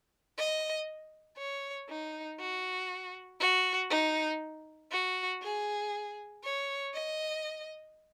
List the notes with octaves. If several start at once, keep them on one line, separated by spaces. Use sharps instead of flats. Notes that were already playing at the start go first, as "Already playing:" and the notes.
D#5
C#5
D#4
F#4
F#4
D#4
F#4
G#4
C#5
D#5